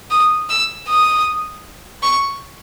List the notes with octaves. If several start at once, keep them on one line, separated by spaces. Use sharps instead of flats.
D#6
E6
D#6
C#6